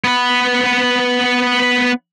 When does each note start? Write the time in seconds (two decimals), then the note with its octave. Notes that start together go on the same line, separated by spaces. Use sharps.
0.04 B3 B4